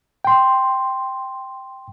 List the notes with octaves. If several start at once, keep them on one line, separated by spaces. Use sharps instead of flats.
G5 C6